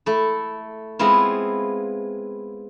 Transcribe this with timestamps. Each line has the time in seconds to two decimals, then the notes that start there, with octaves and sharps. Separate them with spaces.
0.06 A3 E4
0.99 G#3 B3 C4 E4 F4